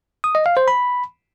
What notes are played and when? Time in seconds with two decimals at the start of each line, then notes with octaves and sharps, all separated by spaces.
0.24 D#6
0.35 D#5
0.46 F5
0.57 C5
0.68 B5